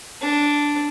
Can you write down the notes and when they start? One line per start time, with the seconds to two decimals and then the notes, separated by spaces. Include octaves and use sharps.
0.22 D4